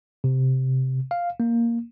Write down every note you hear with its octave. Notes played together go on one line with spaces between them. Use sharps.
C3
F5
A#3